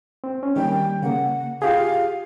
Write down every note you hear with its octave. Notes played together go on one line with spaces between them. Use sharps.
C4
C#4
D#3 G3 A#3 G5
C#3 A#3 F#5
F4 G4 G#4 F5